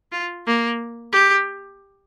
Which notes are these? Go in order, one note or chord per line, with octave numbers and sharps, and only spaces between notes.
F4
A#3
G4